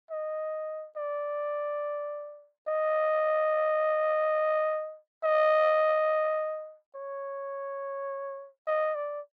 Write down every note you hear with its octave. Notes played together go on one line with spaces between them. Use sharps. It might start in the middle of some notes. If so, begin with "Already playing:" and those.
D#5
D5
D#5
D#5
C#5
D#5
D5